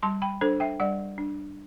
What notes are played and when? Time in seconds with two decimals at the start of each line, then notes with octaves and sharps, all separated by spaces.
0.03 G3 A5 C6
0.22 G5 B5
0.41 D4 A4 C5
0.60 E5 G5
0.80 G3 D5 F#5
1.18 D4